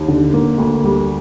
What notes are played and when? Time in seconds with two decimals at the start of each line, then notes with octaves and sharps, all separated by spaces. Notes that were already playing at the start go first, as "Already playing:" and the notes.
Already playing: D#2
0.08 D3
0.34 A#3
0.58 D2
0.84 G3